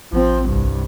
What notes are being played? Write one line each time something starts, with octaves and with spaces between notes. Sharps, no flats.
A1 F3 C4
C2 G2